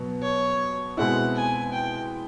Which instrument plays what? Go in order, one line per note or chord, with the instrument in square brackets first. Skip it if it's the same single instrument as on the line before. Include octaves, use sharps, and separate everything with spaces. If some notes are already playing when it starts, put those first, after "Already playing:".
Already playing: [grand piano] B2 F#3 B3
[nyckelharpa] C#5
[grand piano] B2 G#3 C4 E4 [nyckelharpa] F#5
[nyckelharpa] G#5
G5